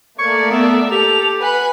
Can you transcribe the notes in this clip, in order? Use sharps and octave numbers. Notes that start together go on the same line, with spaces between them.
A3 A#3 D5 C#6 G#6
B3 E5
G4 A4 F7
B4 F#5 G#5 B5